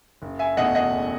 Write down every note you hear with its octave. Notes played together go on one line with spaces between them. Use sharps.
F#1
E5 G#5
E2 B2 A3 D#5 F#5
D#5 F#5
F#1